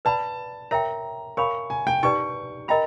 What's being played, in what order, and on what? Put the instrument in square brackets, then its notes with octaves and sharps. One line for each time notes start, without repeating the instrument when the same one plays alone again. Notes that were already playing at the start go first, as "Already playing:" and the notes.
[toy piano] B4 D5 F#5 B5 [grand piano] A5
[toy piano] A#4 C#5 E5 G5 [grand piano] A#5
[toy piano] A#4 C#5 F5 G#5 B5 [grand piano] C#6
[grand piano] G#5
G5
[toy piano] D#4 G4 B4 D5 [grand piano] C#6
[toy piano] A#4 D#5 G5 B5 [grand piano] A#5